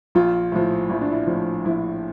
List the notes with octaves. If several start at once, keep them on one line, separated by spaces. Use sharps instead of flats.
A#1 F4
A2 F3
A#1 E4
D4
E4
A2 F3
A#1 E4